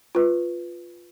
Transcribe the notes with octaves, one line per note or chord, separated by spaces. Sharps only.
F4 B4